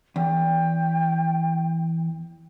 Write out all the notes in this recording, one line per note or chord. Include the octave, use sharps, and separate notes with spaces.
E2 G5